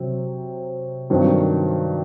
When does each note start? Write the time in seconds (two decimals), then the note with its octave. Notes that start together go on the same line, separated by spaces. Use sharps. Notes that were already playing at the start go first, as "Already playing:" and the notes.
Already playing: C3 F#3 C4
1.10 G2 D#3 F#3 C4